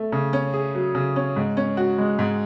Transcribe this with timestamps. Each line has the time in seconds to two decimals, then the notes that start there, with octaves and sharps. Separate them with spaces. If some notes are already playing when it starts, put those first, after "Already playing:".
Already playing: A3
0.12 C#3
0.33 C#4
0.53 G#4
0.75 F#3
0.95 C#3
1.16 C#4
1.36 G#2
1.57 C#4
1.77 F#4
1.98 G#3
2.19 G#2